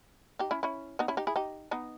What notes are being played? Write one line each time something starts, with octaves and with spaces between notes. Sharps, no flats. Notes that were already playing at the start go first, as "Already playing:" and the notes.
D#4 G4
C#4 E4
C#4 E4
B3 D#4
C#4 E4
D#4 G4
E4 G#4
D#4 G4
B3 D#4